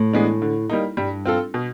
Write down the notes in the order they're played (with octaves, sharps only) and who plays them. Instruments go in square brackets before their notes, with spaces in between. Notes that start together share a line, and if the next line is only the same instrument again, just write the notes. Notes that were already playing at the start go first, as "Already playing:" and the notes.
Already playing: [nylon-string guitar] A2
[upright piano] E3 G#3 B3 D4
D3
G3 A#3 D#4
[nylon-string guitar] G2 [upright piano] G3
[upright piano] C4 F4 A4
B2